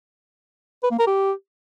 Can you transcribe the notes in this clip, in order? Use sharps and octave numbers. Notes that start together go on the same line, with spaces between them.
B4
A#3
A#4
G4